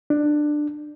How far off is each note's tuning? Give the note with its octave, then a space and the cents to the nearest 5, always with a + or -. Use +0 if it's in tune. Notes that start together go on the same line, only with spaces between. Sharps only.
D4 +15